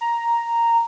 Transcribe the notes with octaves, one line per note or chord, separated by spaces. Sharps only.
A#5